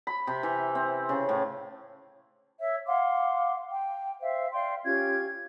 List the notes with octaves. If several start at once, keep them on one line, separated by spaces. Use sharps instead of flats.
B5
C3
E3
C4
C#3
A2
C#5 E5
F5 F#5 C6 D6
G5
C5 E5 F5
D5 F5 G5 C6
C#4 F4 G4 G#6